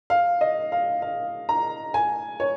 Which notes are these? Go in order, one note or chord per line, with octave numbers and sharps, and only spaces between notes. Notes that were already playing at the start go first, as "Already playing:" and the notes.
F5
D#5
F5
F5
A#5
G#5
C#5